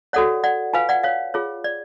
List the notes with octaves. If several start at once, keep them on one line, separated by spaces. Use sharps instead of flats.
F#4 A4 C#5 D5 F#5
D5 F#5
F4 B4 F5 G#5
D5 F#5
C#5 F5
F4 G#4 C#5
D5